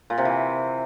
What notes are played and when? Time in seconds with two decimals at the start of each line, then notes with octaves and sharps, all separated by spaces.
0.10 A#2
0.18 C3
0.25 E3